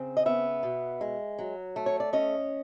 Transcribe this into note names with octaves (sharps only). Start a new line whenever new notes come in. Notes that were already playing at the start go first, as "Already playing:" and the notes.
Already playing: C#3 C4
D#5
B3 E5
B2
G#3
F#3
A3
C#5
D5
C#4 D#5